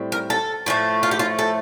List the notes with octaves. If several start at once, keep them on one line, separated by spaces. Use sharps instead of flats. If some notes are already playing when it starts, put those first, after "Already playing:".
Already playing: A2 G3 C4
A#4
A4
A2 F3 A3
F4
G4
F4
A4